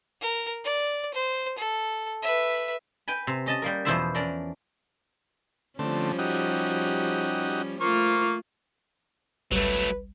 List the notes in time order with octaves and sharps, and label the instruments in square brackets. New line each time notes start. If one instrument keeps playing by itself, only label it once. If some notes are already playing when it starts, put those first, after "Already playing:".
[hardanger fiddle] A#4
D5
C5
A4
B4 E5
[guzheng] B4 G5 G#5 B5
C3
C#4 D#5 A5
G3 A#3 A#4
E2 B2 F3 E4 C5 E5
C#4 D4 A#4 D5
[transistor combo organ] D3 A3 C4 [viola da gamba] F3 G3 C#4
[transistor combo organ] D#4 F#4 G4
[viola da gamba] A3 F4 [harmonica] A#3 C#6 [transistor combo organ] C5
[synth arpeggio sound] G#1 C#2 G3 [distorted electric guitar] F#3 A3 [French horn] B4